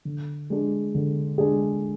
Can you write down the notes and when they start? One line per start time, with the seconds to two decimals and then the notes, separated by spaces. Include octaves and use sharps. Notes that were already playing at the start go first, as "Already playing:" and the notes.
0.05 D3
0.50 G#3 D4 G#4
0.95 D3
1.38 G#3 D4 G#4